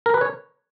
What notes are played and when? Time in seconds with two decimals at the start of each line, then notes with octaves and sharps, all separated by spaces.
0.06 A#4
0.14 B4
0.21 C#5